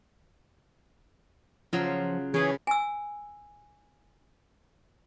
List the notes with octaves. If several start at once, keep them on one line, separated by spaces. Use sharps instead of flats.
C#3 F3 F#3 F4
C#3 E3 G#4 B4 C#5
G#5 E6